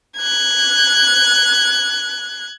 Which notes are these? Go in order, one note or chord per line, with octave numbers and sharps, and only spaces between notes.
F#6 G#6